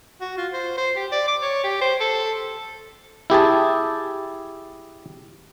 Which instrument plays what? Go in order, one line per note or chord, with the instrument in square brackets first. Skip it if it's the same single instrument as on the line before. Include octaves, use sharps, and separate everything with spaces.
[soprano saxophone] F#4
F4
C5
C5
G4
D5
D6
C#5
G4
C5
A4
[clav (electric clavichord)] E4 G4 G#4 A5